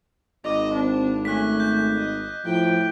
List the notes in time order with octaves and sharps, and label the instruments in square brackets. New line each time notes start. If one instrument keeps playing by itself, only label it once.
[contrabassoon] G#1 [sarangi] D#5 [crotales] D6 F7
[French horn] C4 [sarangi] D4
[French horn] A3 [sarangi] C#4 [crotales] F#6 B6
[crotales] G6
[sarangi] D#5
[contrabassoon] A2 [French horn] F3 [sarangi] G5